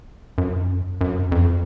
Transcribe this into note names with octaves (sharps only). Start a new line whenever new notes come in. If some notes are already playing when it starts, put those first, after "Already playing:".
F#2
F#2
F2